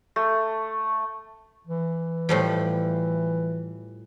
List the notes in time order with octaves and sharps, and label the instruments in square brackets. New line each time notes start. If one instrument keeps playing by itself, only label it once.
[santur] A3
[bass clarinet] E3
[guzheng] A2 F3 G3